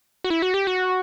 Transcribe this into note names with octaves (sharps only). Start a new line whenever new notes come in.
F#4
E4
F#4
G4
F#4